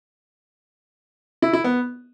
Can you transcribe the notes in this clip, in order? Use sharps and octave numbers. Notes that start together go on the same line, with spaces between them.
E4
E4
B3